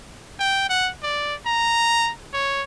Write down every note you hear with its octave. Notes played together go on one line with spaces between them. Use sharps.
G5
F#5
D5
A#5
C#5